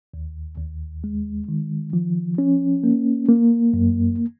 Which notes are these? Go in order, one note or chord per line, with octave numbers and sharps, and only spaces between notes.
D#2
D#2
G#3
D#3
F3
C#4
A#3
A#3
F#2